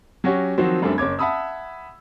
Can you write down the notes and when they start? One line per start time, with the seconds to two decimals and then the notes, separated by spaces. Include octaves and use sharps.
0.24 F#3 C#4 F#4 G4 C#5
0.58 D#3 F3 F#3 C4 F#4 C5
0.82 F#2 G3 A3 C4 D4
0.98 F#1 C#5 D6 G#6
1.19 E5 F#5 A5 B5 D#6 E6